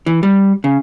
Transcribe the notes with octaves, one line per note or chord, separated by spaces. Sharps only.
E3
G3
C#3